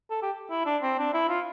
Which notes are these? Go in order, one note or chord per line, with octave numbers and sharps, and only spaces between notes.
A4
G4
E4
D4
C4
D4
E4
F4